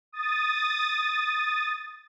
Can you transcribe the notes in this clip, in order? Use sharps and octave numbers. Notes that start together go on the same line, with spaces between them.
D#6 A6